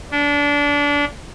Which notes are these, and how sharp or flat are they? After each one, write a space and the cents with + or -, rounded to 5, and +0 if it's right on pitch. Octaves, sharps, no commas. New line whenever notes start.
D4 -25